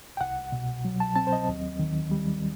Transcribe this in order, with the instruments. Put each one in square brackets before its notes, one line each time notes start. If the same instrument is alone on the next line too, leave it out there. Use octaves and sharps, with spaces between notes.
[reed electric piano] G5
C2 F#5
B2
F#3
A5
C4 A5
C5
D#5
D#2
D#3
G3